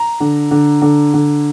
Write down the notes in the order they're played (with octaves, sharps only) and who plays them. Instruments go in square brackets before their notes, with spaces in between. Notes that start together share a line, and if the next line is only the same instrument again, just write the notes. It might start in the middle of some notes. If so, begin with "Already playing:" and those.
Already playing: [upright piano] A#5
D3
D3
D3
D3